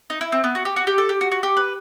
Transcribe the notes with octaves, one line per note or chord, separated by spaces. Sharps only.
D#4
E4
C4
B3
F#4
G4
F#4
G4
A4
G4
F#4
F#4
G4
B4